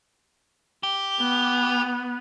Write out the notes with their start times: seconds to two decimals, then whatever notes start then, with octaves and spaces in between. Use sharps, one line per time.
0.83 G4
1.20 B3